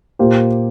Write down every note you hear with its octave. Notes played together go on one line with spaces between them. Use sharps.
A#2 A#3 G4 C5